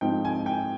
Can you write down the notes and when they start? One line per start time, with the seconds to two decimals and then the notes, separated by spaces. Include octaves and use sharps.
0.01 G#2 F3 C4 D#4 G5
0.25 G#5
0.46 G5